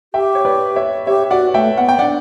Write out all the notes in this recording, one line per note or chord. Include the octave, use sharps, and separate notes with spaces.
G4 E5 G5
C#5
B4 D5
C#5 E5
G4 C#5 E5
F#4 D5 F#5
A3 E5 G5
B3 F#5
G5
D4 D5 F#5